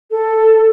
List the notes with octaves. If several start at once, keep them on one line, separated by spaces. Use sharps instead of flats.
A4